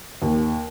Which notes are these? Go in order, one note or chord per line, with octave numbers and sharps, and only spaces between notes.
D#2